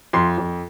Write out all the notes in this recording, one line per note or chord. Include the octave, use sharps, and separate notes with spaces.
F2 C6
F2